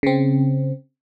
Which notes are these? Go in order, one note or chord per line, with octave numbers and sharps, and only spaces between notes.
C#3 C4